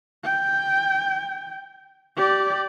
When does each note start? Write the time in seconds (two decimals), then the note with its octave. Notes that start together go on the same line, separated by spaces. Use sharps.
0.24 G5
2.17 G4 D5